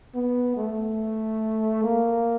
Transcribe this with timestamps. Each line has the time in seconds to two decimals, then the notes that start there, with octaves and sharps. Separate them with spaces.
0.15 B3
0.57 A3
1.84 A#3